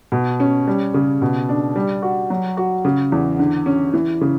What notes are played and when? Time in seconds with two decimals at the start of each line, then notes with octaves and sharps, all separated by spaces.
0.12 B2
0.40 C#4
0.67 G3
0.94 C#3
1.22 B2
1.49 D4
1.76 G3
2.02 F#4
2.30 F#3
2.57 F#4
2.85 C#3
3.12 E2
3.39 D3
3.66 C#4
3.94 E3
4.21 C#3